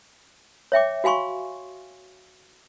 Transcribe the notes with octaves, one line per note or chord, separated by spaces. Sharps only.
C#5 E5 G5 D6
F#4 F5 G#5 C6 C#6